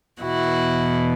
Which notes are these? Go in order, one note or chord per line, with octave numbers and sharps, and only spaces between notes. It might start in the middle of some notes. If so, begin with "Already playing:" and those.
E2 B2 E4 F#4